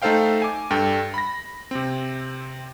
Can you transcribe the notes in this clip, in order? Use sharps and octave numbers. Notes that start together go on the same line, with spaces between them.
A3 D#4 A4 C5 F5 G5
G#5 D6
G2 A4 G5
B5 A#6
C3 C4